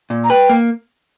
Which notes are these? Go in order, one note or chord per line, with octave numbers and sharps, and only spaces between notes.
A#2
A#5
B4 G5
A#3